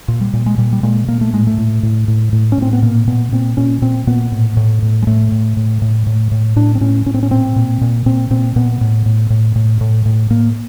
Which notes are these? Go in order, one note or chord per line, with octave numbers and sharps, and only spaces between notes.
A#2
G3
A#2
G#3
A#2 G3
G3
A#2 G#3
A#2 A#3
A3
A2 G#3
A3
A2
A2
A2
A2
C#4
A2 C4
B3
A#2 A#3
A#2 B3
A#2 C4
A#2 C#4
A#2 C4
A#2 B3
A2
A2
A2
G#3
A2 A3
A2
A2
A2
A2
A2
A2 D4
C4
A2 C#4
A2 C#4
C4
C#4
A#2 C4
A#2
A#2
A#2 C4
A#2 C4
A#2 B3
A2
A2
A2
A2
A2
A2
A2 A#3